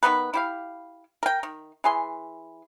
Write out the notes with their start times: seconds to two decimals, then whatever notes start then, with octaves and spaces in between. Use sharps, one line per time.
0.03 D#3 F#3 B3 B4
0.34 E4 G4 F5
1.23 A#4 G5
1.43 D#3
1.84 E3 G#4 C6